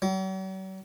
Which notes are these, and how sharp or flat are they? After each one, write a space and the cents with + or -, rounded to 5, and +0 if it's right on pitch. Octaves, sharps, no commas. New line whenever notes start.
F#3 +45